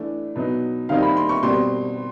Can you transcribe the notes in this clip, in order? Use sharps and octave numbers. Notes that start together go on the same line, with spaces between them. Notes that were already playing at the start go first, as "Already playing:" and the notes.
Already playing: E3 A3 D4
B2 F#3 B3 D#4
D#3 G3 C4 D#4 F5
B5
C6
C#6
B2 G3 C4 C6